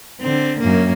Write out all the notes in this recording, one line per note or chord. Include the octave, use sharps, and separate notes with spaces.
D3 C4
F#2 A#3